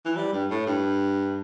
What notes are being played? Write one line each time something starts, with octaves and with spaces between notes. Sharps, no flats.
E3
G3
G2
A2
G2